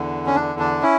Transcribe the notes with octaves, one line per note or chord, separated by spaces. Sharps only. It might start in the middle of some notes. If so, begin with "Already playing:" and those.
Already playing: E2 D3
C#4
E2 D4
D3
D4
C#4 E4